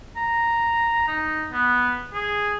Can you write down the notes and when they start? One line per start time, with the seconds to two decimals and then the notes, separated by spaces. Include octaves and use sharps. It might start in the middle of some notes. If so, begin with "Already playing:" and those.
0.16 A#5
1.08 D#4
1.52 B3
2.14 G#4